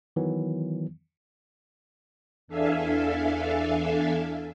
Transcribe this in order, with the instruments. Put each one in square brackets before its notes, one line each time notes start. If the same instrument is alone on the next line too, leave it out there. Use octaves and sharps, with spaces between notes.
[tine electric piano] D#3 E3 F#3 B3
[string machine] E2 D4 A4 E5 F5 G#5